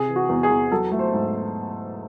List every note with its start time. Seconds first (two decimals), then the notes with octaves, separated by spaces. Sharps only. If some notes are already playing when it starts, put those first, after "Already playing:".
Already playing: C3 G#4
0.08 E3
0.16 F#4
0.29 E2
0.43 G#4
0.50 E2
0.72 F#3 A4
0.92 A3
0.99 C5
1.13 G#2